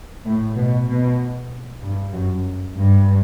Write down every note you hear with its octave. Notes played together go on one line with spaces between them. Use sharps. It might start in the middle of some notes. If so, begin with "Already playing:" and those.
A2
B2
B2
G2
F#2
G2